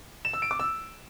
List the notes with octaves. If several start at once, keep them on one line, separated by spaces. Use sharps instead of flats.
E7
E6
D7
D6
E6